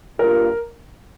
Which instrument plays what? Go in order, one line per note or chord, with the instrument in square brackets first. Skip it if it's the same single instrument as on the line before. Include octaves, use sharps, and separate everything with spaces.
[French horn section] G2 G3 A#3 F4 [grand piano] A#4